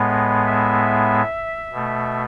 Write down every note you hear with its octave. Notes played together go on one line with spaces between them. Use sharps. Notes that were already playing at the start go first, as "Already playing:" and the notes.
Already playing: A2 G#3 B3
E5
B2 A3